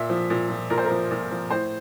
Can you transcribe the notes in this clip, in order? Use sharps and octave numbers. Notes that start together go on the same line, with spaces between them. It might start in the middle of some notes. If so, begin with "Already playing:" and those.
Already playing: A#2 E5
F3
A#2
F3
A#2 A#4
C5
A#4
F3
A#2
F3
A2 C5